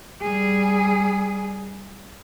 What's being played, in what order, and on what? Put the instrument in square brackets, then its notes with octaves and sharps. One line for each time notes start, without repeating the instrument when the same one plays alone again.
[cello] G3 G#4